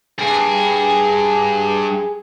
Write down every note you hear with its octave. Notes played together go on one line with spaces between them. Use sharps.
G2 G#4